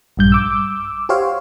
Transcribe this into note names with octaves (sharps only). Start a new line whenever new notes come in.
A#1 G2 G6
D6 E6
F#4 G4 C5 C#5 F5